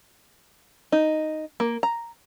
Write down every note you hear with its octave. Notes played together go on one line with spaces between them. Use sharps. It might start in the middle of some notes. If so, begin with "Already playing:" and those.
D#4
A#3
A#5